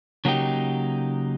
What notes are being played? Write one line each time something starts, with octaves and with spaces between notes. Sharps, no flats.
C#3 F#3 A#3 D#4 G4